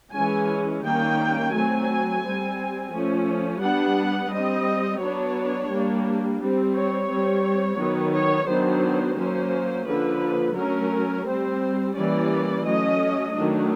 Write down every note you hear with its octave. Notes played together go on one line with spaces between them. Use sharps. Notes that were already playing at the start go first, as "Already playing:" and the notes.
E3 G#3 C#4 G#5
D#3 G3 A#3 C#4 G5
F#3 A3 C4 G#5
G3 C4
F3 A3 C#4
G3 B3 D4 F#5
G3 C4 D#5
F#3 B3 D4 C#5
G3 A#3 D4
G3 C4
C#5
G3 C4
D#3 F#3 B3
C#5
D#3 F#3 B3 D4 C5
F#3 A#3 C#4 C5
D3 F3 A#3 B4
F#3 A3 C#4 A#4
G3 C4 C5
E3 G3 A#3 C#4 D5
F#3 A3 C#4 D#5
D#3 F#3 A3 D4